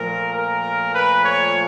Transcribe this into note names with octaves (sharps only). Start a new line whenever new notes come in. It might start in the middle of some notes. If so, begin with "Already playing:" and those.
Already playing: A#2 F3 A3 A#4
A#4
B4
C#5